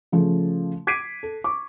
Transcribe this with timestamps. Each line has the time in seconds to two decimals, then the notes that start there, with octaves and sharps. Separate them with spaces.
0.12 C#3 F3 A3
0.87 D6 G#6 B6 C7 D7 D#7
1.23 A4
1.44 C#6 D6